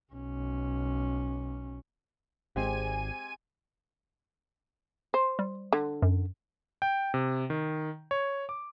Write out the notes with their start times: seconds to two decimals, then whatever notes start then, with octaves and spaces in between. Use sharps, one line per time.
0.13 B1 C#4
2.56 G#1 G#3 C4 G4 G#5 D#7
5.14 C5
5.39 G3
5.73 D3
6.02 F#2
6.82 G5
7.14 C3
7.50 D#3
8.11 C#5
8.49 D6